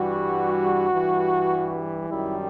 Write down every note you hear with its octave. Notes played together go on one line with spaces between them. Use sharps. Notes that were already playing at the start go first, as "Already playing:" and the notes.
Already playing: G2 E3 G3 F#4
G2 E3 G3
F#2 D#3 G3 E4